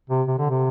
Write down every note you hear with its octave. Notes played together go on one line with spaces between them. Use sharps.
C3
C3
D3
C3